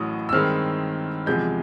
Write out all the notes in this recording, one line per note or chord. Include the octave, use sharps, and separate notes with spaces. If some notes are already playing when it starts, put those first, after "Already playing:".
Already playing: A1 A2 F#3 D#6
E6
G2 D#3 G#3 C4 F6
E2 C3 F3 G#3 G6